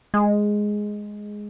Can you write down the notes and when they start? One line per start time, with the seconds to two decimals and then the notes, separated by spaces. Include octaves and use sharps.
0.14 G#3